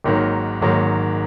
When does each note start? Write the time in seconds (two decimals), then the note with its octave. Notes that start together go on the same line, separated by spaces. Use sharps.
0.04 G#1 G#2 D#3 F#3 A#3
0.61 G#1 G#2 D#3 F#3 A#3